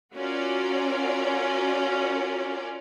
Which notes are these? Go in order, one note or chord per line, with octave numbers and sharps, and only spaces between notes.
C#4 F4 F#4 A#4 D5